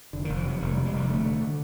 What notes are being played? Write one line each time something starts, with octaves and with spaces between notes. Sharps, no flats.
F1 D3
D#3
F1
F3
C3 F#3
F1 D#3
G3
C3
G#3
F1 G3
D3 A3
D3
D3